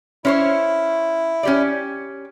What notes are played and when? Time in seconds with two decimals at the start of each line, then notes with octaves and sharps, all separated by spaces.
0.25 C#4 E4 C5 C#5
1.43 C#4 G4 D5